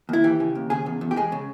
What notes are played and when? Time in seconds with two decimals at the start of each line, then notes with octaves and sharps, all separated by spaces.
0.09 D#2 E4
0.24 E3 G4
0.40 C#3
0.55 D#2
0.70 C#3 G#4
0.86 E2
1.01 E2
1.11 G4
1.16 G#3 G#4
1.32 C#3